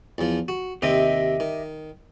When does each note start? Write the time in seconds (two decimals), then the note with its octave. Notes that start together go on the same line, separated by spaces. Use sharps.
0.18 E2 F3
0.48 F#4
0.82 D#2 C3 C4 G4 D#5 E5
1.40 D#3